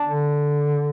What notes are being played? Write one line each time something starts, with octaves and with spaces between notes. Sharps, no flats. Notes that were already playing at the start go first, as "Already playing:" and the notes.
Already playing: D4
D3